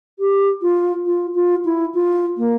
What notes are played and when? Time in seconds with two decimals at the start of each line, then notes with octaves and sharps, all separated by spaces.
0.19 G4
0.62 F4
1.06 F4
1.35 F4
1.65 E4
1.94 F4
2.37 A#3